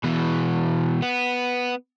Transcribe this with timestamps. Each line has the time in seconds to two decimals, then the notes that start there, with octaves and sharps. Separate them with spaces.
0.04 B2 E3
1.02 B3